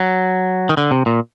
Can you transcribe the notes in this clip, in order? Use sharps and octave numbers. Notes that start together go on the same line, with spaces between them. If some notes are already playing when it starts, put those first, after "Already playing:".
Already playing: F#3
D#3
D3
C3
A#2